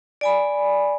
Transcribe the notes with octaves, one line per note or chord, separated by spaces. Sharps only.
D5 G#5 B5